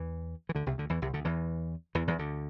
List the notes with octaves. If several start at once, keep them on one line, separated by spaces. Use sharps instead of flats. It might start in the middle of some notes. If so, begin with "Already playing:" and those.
Already playing: E2 E3
E3
D2 D3
C2 C3
D2 D3
E2 E3
C2 C3
D2 D3
E2 E3
E2 E3
E2 E3
D2 D3